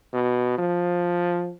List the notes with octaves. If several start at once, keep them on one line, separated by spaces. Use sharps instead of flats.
B2
F3